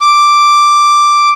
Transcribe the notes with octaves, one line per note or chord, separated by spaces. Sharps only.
D6